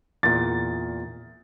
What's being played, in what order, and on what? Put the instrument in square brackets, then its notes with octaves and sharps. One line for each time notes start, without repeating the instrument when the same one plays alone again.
[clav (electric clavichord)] E2 A#2 [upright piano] A6